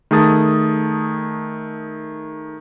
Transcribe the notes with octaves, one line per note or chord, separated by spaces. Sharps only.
D#3 A3 G#4 A5 D#6 A6